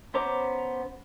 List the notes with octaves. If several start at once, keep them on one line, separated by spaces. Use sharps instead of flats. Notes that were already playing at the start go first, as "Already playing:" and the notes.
B3 C#4 C5 A#5 D6